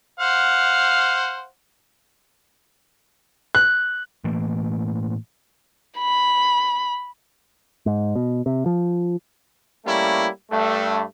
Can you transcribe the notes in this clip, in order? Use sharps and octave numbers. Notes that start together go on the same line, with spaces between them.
C5 F5 F#5
F#6
A2 E3 A3 A#3
B5
G#2
B2
C3
F3
G3 A3 A#3 C#4 E4
G2 A3